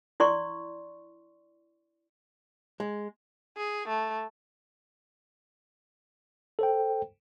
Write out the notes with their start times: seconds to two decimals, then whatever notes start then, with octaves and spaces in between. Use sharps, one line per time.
0.20 E4 D5 C6 C#6
2.80 G#3
3.57 G#4
3.88 A3
6.59 A4 C5 G5